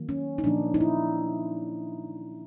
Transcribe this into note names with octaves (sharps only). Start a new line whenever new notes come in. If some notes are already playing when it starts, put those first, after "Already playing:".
Already playing: D#3 F#3 A#3
C#4
D#4
A#2 F3 A#3 D4
D#4
E4